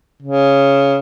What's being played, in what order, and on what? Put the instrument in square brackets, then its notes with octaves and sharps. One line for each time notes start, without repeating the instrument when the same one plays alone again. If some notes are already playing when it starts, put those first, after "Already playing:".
[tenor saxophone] C#3